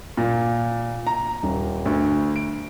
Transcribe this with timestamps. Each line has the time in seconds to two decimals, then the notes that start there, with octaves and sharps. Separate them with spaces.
0.17 A#2
1.07 A#5
1.43 D#1
1.86 D2
2.36 D7